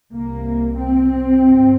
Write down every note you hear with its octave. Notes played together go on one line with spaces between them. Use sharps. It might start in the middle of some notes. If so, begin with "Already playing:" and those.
C2 C3 A#3
C4
G1 F2 C3